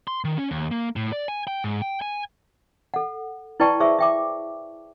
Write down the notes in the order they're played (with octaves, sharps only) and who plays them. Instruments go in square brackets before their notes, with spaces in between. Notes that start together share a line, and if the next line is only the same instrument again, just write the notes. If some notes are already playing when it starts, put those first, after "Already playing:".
[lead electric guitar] C6
D#3
C#4
D#2
A#3
A2
D5
G#5
G5
G#2
G5
G#5
[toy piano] A4 F#5
E4 B4 D5 G5 A5 C#6
G#4 C5 E5 C#6 E6
E5 G5 D6